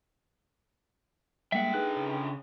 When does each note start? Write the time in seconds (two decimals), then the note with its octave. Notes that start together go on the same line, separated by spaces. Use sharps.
1.52 D3 G3 G#3 A#3 E5 F#5 G5
1.74 D#4 G#4 B4 F#6
1.96 C#3